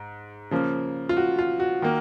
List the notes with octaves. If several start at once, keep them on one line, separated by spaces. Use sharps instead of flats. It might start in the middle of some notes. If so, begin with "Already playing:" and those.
Already playing: G#2
C#3 F3 A#3
F4
F#4
F4
F#4
D#3 A#3